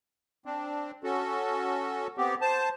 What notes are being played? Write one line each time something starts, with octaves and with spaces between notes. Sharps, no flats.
C4 D4
C#4 F#4 A4
B3 C4 G4
C5 A5